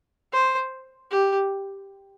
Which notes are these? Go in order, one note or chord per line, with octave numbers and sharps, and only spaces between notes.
C5
G4